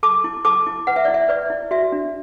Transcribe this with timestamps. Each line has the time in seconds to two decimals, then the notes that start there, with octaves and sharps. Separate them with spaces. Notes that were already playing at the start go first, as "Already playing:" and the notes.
0.03 A4 A5 D6
0.24 E4
0.45 A4 A5 D6
0.67 E4
0.87 B4 F#5
0.96 E5
1.05 E4 D5
1.14 E5
1.29 B4 D5
1.50 E4
1.71 F#4 E5
1.92 D4